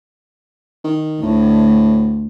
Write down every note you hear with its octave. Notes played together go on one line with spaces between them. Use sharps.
D#3
D2 A2